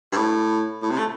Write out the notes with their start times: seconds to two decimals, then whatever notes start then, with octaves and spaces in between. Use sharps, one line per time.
0.12 G2
0.16 A2
0.82 A2
0.91 C3
0.99 A3